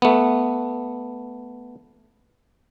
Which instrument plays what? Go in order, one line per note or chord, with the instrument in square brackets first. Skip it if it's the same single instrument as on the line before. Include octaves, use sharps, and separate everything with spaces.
[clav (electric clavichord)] A3 B3